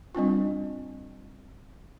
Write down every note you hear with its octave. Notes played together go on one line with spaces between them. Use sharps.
G3 C4 D4 F4